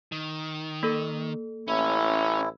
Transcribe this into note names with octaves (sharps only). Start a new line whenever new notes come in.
D#3
A#3 A4
A1 C#4 E4